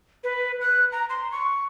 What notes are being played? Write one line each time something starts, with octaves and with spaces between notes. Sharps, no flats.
B4
F#6
A#5
C6
C#6